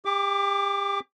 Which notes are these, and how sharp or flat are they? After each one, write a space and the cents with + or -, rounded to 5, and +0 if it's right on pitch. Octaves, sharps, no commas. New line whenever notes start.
G4 +35 D6 +0